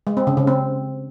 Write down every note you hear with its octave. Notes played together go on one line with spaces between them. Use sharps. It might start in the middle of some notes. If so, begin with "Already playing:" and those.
G#3
C4
C#3
C#3
C4